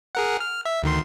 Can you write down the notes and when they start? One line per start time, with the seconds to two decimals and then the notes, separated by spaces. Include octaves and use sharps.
0.15 G#4 A#4 F#5
0.40 F6
0.65 E5
0.83 D2 D#3 C6